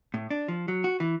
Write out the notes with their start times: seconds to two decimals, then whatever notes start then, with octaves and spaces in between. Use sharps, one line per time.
0.14 A2
0.30 D4
0.48 F3
0.68 F#3
0.84 F#4
1.00 E3